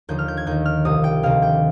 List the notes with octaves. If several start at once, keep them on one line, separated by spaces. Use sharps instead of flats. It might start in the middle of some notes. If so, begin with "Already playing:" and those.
D#2 D3 F3 G6
F6
G6
G#6
D#2 D#3 G6
F6
C2 C3 F3 D#6
G5
D2 C3 D#3 F5
G5